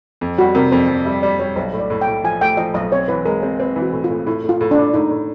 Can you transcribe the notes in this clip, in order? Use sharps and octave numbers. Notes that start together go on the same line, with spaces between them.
F2
G3 F#4
C3 A#4
F2 C5
F2
G3 E5
G3 D5
G3 C#5
B1 C5
A2
D5
A2
G5
A2
F3 G#5
A3 G5
F3 D#5
B1 D#5
C4 C#5
E3 B4
G#3 A#4
C4 C5
C4 B4
E3
F#4
A2
F4
A2
A2 E4
A2
F4
A2
D4
A2
A2 D#4
A2